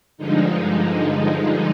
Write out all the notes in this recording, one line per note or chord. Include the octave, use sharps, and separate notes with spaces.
G2 D3 F3 G#3 D#4